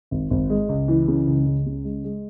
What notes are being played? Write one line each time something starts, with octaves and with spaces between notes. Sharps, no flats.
G#1
G#1
G#3
C#2
E3
C#3
C#2
C#2
C#3
G#3
G#3